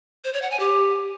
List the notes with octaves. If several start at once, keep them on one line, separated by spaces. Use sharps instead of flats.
C5
C#5
F#5
G#5
G4